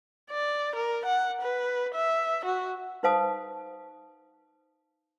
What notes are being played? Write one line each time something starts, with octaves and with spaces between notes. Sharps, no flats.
D5
A#4
F#5
B4
E5
F#4
D#4 B4 C5 F5 A5 D#6